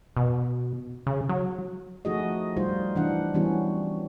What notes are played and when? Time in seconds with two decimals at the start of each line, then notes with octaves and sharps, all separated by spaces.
0.17 B2
1.07 C#3
1.29 F#3
2.05 F3 A3 D#4 F#4 G#4 D#5
2.57 G3 D#4 F4 C5
2.96 E3 D4 F#5
3.34 E3 F#3 G3 B3 C#4 F#4